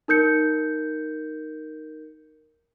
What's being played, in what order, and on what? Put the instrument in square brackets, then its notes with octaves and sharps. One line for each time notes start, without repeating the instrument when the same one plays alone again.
[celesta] D#4 A#4 G6 C#7